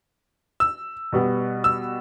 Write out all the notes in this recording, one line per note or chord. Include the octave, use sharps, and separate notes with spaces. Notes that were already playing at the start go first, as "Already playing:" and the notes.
E6
B2 G3 B3
E6